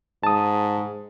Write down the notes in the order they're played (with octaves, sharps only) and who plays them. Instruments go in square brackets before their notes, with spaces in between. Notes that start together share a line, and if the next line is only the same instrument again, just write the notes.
[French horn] G#2 [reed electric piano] A5 D#6